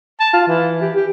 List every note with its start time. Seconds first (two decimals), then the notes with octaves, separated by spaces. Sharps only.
0.20 A5
0.33 F4
0.47 E3
0.82 G4
0.96 G4